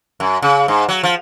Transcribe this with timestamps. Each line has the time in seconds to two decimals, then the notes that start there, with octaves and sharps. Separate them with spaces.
0.20 F#2
0.42 C#3
0.68 G#2
0.89 F#3
1.03 F3